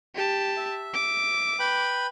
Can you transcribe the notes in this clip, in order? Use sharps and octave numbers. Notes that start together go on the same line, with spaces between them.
G4 A5
E5
D6
B4 G5 B5